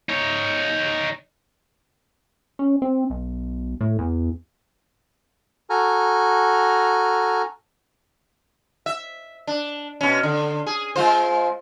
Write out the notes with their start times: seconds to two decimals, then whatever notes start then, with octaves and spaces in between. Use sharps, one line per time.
0.09 D#4 C#5
2.59 C#4
2.82 C4
3.10 B1
3.81 A2
3.99 E2
5.70 F#4 A4 G#5 A#5 F6
8.86 E5
9.47 D4
10.01 B2 C#4
10.23 D3
10.67 G#4
10.96 G#3 F4 C5